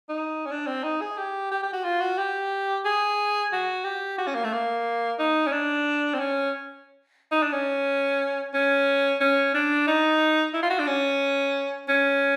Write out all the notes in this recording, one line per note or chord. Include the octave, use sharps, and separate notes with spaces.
D#4
C#4
D4
C4
D#4
G#4
G4
G4
G4
F#4
F4
F#4
G4
G#4
F#4
G4
F#4
C#4
A#3
A3
A#3
D#4
C#4
D4
C4
C#4
D#4
D4
C#4
C#4
C#4
D4
D#4
E4
F4
F#4
D4
C#4
C#4